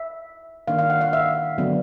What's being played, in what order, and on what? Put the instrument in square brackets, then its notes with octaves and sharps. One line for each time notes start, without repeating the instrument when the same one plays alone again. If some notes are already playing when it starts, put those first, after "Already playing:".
Already playing: [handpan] E5
D#3 G3 A#3 D4 F5
F5
F#5
F5
E5
D3 F#3 B3 D4